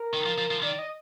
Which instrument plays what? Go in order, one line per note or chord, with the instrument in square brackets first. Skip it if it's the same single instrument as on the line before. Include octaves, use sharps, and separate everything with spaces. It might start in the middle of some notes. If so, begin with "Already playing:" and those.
Already playing: [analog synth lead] A#4
[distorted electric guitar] D#3
F3
F3
F3
[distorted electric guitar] D#3 [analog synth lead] D5
[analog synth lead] D#5